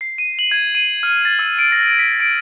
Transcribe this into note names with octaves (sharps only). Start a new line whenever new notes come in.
C7
D#7
F#7
G#6
D#7
F6
A6
E6
D7
A#6
B6
D7